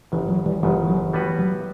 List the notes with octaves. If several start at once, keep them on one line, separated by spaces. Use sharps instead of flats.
G1 F#2 C#3 E3
F#3
E3 G3
G1 F#2 C#3 E3 G3
E3
F#3
A2 E3 G3 B3 F#4 B4
F#3